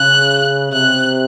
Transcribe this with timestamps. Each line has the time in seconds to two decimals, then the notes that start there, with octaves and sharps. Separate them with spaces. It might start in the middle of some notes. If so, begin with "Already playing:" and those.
Already playing: C#3 F#6
0.72 C3 F#6